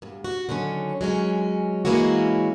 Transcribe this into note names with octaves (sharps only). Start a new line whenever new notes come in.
D2 G2
F#4
D3 D#3 F#3 C#4
F#3 G#3 C#4
E3 G#3 A#3 C#4 E4 F#4